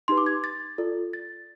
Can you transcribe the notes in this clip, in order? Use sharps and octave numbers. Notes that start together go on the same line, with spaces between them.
D#4 G4 B4 C6
D6
G#6
A6
F4 A4 D5
A6